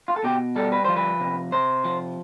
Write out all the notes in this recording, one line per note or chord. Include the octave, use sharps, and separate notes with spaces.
F4
A4
B2 G4
G3 A4
B4
F3 C5
B4
C3
C3 C5
F3